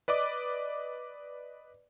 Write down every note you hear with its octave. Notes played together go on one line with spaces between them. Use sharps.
B4 D5 D#5 D6